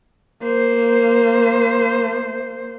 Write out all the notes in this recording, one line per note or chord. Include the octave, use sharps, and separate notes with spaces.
A#3 C5